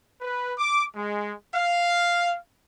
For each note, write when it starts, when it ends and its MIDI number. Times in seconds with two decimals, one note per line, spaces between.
0.21 0.53 71
0.58 0.84 86
0.95 1.32 56
1.53 2.35 77